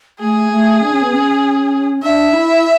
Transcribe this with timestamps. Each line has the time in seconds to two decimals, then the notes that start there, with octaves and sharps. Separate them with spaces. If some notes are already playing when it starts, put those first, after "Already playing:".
0.20 A3 G#4
0.51 A3
0.81 D4
0.92 C#4
1.02 B3
1.13 C#4
2.02 D4 E5
2.33 E4